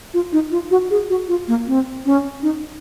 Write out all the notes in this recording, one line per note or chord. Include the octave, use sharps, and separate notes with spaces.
F4
D#4
F4
F#4
G#4
F#4
F4
A#3
C4
C#4
D#4